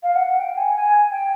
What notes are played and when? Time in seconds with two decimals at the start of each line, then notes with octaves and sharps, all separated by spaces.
0.03 F5
0.15 F#5
0.27 F#5
0.38 G5
0.56 G#5
0.75 G#5
1.10 G5